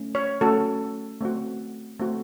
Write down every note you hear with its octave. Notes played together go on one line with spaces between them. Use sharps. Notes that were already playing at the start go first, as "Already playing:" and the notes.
Already playing: A3 C#4
C#5
A3 C#4 F#4 A4
A3 C4 F#4
A3 C4 F#4